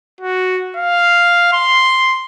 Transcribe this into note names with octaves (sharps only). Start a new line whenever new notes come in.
F#4
F5
C6